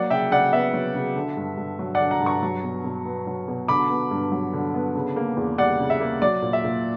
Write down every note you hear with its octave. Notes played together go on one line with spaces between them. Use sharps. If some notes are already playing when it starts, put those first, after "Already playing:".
Already playing: F#3 A#3 D5 F#5
C#3 E5 G5
C#3 D5 F#5
B3 E5
F#3
C#3
D3
G2
G2
F#3
D5 F#5
D3
F#5 A#5
G2
A#5 C#6
F#3
B2
B2
B3
F#3
B2
D3 B5 D6
B3
G2
F#3
D3
B3
C#3
A#3
E2
G3 D5 F#5
C#3
E5
A#3
F#3 D5
A#2
E5
A#2